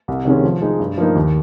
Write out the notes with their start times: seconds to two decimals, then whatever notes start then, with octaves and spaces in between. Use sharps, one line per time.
0.08 C2
0.25 C3 D#3 G#3 C#4
0.44 F3
0.62 G#3 D#4
0.79 G2
0.98 F3 A#3 D#4
1.15 D#2